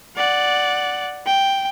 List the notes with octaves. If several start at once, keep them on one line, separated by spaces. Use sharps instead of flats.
D5 F#5
G5